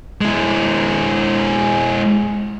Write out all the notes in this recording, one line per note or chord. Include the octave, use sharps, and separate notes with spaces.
G#3 E4